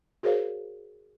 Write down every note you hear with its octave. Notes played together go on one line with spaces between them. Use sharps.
F#4 G#4 A#4 C5 C#5 F5